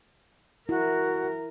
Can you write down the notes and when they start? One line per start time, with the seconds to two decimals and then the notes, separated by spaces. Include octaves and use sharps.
0.69 E4 F#4 A#4